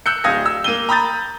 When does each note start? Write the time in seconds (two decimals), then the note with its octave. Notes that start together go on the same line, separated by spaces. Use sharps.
0.06 E6 F#6 G6 C#7
0.24 D1 F5 D#6 G#6 A#6
0.46 E6
0.64 A#3 D#7 G7
0.89 A#5 B5 D#6 G6 A6